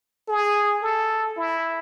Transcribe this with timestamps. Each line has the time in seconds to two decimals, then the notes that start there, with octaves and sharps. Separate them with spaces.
0.29 G#4
0.83 A4
1.37 E4